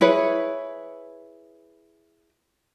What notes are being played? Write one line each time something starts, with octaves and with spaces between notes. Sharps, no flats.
E4 G#4 B4 C#5